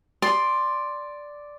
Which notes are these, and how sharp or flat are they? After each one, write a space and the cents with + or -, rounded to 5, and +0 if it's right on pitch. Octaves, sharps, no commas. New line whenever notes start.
D5 +0 C6 +5 D#6 -35